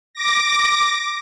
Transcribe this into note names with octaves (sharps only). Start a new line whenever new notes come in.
D6 A#6